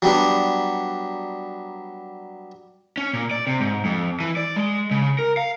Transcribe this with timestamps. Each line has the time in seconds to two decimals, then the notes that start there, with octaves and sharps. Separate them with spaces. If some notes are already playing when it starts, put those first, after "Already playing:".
0.02 F#3 G3 B3 D4
2.98 C#4
3.13 A#2
3.31 D5
3.47 C3
3.60 G#2
3.85 F2
4.20 E3
4.37 D5
4.56 G#3
4.91 C#3
5.19 A#4
5.37 F5